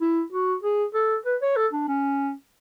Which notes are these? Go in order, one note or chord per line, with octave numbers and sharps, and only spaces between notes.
E4
F#4
G#4
A4
B4
C#5
A4
D4
C#4